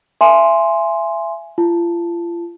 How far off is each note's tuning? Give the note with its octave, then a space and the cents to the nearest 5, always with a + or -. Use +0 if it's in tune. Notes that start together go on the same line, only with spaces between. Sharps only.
E5 +30 G#5 +5 C6 +0
F4 -40 A5 +0